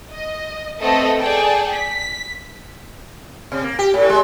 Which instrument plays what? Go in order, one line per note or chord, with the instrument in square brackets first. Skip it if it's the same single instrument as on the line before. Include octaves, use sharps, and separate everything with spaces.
[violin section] D#5
A3 B3 C4 A4 D#5
G#4 A4 D5 G5 A5
B6
[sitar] C3
A#3
G4
A2
G#3